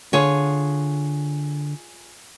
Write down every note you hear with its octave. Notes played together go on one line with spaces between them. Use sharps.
D3 F4 G#4 C#5